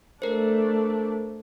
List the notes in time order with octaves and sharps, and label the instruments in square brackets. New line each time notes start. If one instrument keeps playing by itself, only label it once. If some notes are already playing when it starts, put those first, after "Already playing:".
[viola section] A3 D4 [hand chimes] A#4 C5